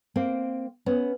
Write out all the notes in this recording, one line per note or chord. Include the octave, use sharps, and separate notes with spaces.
A#3 C4
B3 C#4